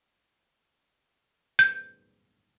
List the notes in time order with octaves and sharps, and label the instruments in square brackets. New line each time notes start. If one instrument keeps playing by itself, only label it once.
[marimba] G6